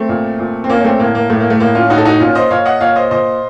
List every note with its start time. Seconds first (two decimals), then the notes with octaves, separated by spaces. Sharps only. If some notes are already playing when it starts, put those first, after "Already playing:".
Already playing: A3 C4
0.09 A#2
0.39 A#2
0.64 C4
0.69 A#2 A#3 C#4
0.80 C#4
0.85 A3 C4
1.00 A2 A#3
1.15 A#3
1.30 A2 A3
1.40 A#3
1.50 A3
1.60 A2 A#3
1.75 C#4 F4
1.90 A2 D#4 F#4
1.98 A4
2.05 D#4 F#4
2.20 A#2 C#4 F4
2.35 C5 D#5
2.50 A#2 C#5 F5
2.66 D#5 F#5
2.81 A#2 C#5 F5
2.96 C5 D#5
3.11 A#2 C5 D#5